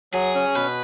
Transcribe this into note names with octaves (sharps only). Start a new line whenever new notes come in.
F#3 G#4
C#4
B2 B4